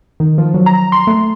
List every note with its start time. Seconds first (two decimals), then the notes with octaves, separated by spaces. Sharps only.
0.20 D#3
0.38 F3
0.54 F#3
0.66 A#5
0.92 C6
1.07 A3